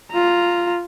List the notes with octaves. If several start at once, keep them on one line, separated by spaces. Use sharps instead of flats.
F4 A#5